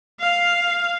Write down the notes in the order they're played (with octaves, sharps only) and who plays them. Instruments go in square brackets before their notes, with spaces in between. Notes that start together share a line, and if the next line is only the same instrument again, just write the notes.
[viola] F5